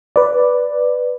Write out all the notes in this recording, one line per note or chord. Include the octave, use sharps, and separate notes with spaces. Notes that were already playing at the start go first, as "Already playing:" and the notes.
B4 D5